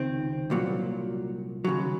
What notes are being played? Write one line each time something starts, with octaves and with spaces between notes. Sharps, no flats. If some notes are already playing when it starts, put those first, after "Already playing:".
Already playing: C#2 C3 D#3 C4
C2 A#2 F#3
D#2 C#3 F#3